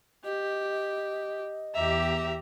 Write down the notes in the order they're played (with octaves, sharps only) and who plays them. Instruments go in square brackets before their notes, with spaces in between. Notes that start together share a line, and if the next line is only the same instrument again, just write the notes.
[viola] G4 [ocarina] D#5
[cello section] E2 G4 [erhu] E5 [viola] A#5